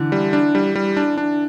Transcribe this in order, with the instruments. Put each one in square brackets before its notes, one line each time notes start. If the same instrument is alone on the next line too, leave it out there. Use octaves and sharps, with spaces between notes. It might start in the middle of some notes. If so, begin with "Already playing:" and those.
Already playing: [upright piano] D3 E3
[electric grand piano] G3
D4
G3
G3
D4
D4